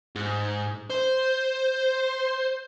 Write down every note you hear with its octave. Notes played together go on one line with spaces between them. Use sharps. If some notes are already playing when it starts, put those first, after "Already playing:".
G#2
C5